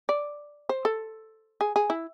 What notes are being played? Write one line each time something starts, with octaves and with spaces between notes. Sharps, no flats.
D5
C5
A4
G#4
G#4
E4